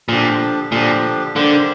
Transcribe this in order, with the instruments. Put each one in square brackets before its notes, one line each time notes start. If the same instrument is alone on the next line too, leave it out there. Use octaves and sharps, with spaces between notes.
[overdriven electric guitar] A#2 [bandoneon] D3 F3 D4 G4
[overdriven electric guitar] A#2 [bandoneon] D3 F3 D4 G4
[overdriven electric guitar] D3 [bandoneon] G3 A#3 G4 C5